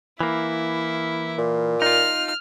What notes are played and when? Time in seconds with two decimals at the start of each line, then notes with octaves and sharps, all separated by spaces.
0.20 E3 A#3 E4
1.38 A#2
1.82 D#4 F4 F6